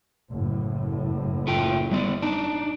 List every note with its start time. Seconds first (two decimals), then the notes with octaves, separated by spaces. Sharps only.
0.29 F#1 A2
1.47 A3 F4 G5
1.91 G3 B3 D5
2.22 D4 D#4